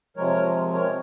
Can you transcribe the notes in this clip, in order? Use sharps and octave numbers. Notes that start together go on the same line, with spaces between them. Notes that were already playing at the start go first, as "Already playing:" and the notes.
C3 F3 G#3 A#4 C#5
A#4 C#5